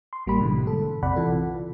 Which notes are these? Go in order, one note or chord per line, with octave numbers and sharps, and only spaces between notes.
C6
A1 G3 A#3 G4 B5
G#2 B2 D3 E3 G#3
A4
A#1 F2 C3 D5 F#5 B5
C3 E3 F4 A4